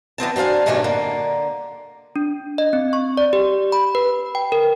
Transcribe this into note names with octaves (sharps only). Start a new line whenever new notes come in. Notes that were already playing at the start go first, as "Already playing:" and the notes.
E3 B3 C4 A5
F#3 D4 C5 F5 G#5
G2 B2 D#3 A3 C#4 D4
D3 A#3
D4
D#5
C4
C#6
D5
G4
B5
B4
G5
A#4